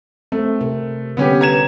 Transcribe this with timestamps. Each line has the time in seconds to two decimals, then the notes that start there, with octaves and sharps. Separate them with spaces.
0.32 A3 C4
0.61 C3 A#4
1.17 D3 G3 B3 C#4 G4
1.41 A#5 G#6 E7